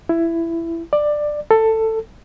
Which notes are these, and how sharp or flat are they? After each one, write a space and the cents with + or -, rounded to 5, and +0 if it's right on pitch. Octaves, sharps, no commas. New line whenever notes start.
E4 +15
D5 +15
A4 +15